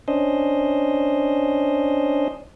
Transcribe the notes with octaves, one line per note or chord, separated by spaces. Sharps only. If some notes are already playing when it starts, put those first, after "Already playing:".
C#4 D4 C5 D#5